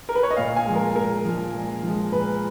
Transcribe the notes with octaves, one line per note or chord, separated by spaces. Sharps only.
A#4
B4
C#5
D#5
A#2 F5
G#5
F3 G#3
A#4
A#2 A#4
F3 G#3
A#2
F3 G#3
A#2 B4